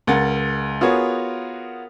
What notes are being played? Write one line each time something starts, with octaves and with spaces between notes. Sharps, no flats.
C#2 A#4 F#5 A6
B3 F4 F#4 G#4 A#4 C#5